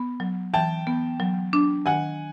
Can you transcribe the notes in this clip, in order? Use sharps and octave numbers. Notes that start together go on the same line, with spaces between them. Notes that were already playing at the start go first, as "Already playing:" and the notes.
Already playing: B3
F#3
E3 G5 A5
B3
F#3
D4
D#3 F#5 G#5